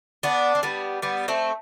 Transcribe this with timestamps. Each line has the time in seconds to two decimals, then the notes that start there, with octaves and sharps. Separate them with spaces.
0.23 B3 D4
0.55 C4
0.63 G3 B3
1.02 G3 B3
1.28 A3 C4